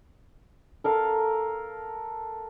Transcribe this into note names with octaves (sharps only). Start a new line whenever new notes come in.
A4 A#4 F5